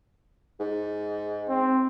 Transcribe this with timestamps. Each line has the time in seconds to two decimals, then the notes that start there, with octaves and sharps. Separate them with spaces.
0.60 G#2
1.49 C4